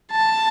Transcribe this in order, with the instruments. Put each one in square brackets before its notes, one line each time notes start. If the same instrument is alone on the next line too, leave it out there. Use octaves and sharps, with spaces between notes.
[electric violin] A5